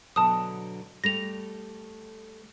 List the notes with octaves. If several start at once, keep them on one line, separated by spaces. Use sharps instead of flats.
B2 D3 F#3 A5 D#6
G3 A3 G4 A#6 F7